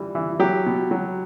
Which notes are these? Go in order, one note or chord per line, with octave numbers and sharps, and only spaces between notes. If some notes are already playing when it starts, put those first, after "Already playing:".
Already playing: E3 G3
E3
F#3 G4
B2
F#3